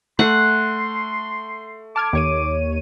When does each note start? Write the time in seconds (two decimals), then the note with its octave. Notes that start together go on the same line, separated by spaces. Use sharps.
0.19 A3 F#5 C6
1.96 A5 D6 F6 G#6
2.13 D#2 C#5 D#7